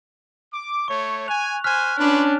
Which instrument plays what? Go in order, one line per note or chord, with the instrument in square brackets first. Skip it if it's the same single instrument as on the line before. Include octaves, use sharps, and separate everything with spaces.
[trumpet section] D6
[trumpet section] A3 C#5 [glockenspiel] C#6
[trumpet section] G#5 [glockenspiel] F#6 F7
[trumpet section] C5 G#5 [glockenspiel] F6 F#6 B6
[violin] C#4 D4 [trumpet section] F4 B4 D5